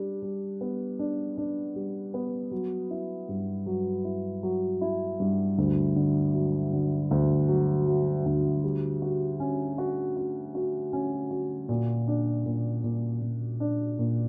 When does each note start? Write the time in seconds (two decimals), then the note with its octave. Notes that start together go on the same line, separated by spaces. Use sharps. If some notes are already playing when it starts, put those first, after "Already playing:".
Already playing: G3 D4
0.22 G3
0.61 B3
0.99 D4
1.38 D4
1.76 G3
2.14 B3
2.51 F#3
2.91 E4
3.29 G2
3.66 F#3
4.05 E4
4.43 F#3
4.81 E4
5.20 G2
5.58 D2
5.96 D3
6.34 F#3
6.73 D3
7.11 D2
7.49 F#3
7.87 F#3
8.26 D2
8.64 G3
9.02 F#4
9.40 C#4
9.78 F#4
10.17 F#4
10.55 F#4
10.93 C#4
11.31 F#4
11.69 A#2
12.08 D4
12.46 A#2
12.84 A#2
13.22 A#2
13.60 D4
13.99 A#2